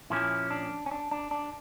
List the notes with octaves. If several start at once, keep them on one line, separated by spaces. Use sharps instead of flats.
A#2 F3 A#3 C#4 E4
D4
C#4
D4
D4
D4